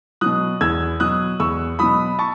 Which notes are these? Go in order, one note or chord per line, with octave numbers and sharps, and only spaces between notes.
B2 F#3 D#6 F#6
E2 E6 G#6
B2 F#3 D#6 F#6
E2 C#6 E6
B2 F#3 B5 D#6
A5 C#6